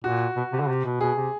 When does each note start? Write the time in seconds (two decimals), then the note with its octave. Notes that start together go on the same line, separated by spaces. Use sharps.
0.04 A#2 F#4
0.37 B2
0.53 C3
0.60 D3
0.69 C3
0.85 B2
1.00 B2 G#4
1.17 C3